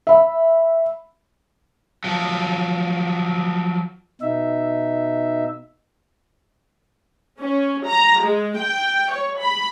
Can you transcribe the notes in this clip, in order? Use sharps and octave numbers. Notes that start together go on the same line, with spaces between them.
E5 B5
F3 F#3
B2 D#4 E5
C#4
A#5
G#3
G5
C#5
B5